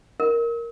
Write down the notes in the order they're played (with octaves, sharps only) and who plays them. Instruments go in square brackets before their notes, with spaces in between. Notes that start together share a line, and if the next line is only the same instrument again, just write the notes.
[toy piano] A#4